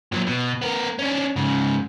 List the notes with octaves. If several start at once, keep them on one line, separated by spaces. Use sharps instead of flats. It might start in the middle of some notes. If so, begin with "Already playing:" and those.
A#2 F#3
B2
B3 A#4
C#4 D4
G#2 C#3